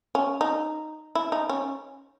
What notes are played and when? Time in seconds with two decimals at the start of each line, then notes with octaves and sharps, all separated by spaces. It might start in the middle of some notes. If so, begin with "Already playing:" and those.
0.15 C#4
0.41 D#4
1.15 E4
1.32 D#4
1.49 C#4